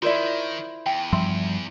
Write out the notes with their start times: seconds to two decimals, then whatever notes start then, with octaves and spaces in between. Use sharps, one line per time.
0.02 D#3 E4 F4 A#4 C5 D5
0.86 E2 G5
1.13 G2 F3 G3 E5 C6 E6